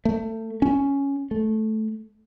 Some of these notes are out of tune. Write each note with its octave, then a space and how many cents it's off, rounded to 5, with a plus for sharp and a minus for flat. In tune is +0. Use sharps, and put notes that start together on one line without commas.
A3 +25
C#4 +5
A3 -10